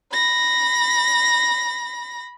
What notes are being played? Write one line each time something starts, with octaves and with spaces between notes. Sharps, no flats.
B5 A#6